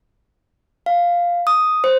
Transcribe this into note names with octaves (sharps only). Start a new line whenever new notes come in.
F5
D#6
C5